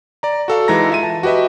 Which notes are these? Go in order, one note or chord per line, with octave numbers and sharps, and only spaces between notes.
D5 A#5
F#4 A4 F5
E3 G#3 D#4 A#5 A#6
F4 E5 D#7
A5
F#4 G4 B4 D#5 E5